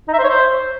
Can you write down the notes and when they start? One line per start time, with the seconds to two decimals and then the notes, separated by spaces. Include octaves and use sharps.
0.08 D#4
0.13 E5
0.19 C5
0.24 C#5
0.29 C5